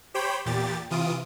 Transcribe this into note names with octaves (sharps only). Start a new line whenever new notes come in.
G4 C5 C#5 G5 B5
E2 A#2 G4 A6
C3 E3 F4 D#6 D7